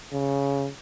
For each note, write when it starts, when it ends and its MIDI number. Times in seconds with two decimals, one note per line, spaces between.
0.13 0.69 49